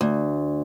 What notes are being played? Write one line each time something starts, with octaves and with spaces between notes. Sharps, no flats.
D2